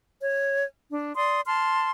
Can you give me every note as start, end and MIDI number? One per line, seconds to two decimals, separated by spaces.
0.20 0.63 73
0.92 1.15 62
1.16 1.40 74
1.16 1.40 84
1.16 1.40 87
1.46 1.90 81
1.46 1.90 84
1.46 1.90 89